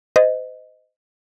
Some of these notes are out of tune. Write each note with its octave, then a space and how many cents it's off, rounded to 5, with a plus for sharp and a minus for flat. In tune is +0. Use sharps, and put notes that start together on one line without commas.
C5 -35 D#5 +0